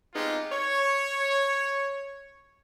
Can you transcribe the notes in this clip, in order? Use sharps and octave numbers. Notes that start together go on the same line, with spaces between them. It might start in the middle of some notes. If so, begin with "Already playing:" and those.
G#3 B3 C4 D#4 F4 G4
C#5